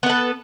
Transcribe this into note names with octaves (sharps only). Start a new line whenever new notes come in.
B3 A4 B4